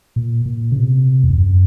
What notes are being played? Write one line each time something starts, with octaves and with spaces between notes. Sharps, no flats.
A#2
A#2
C#3
C3
E2
F2
F#2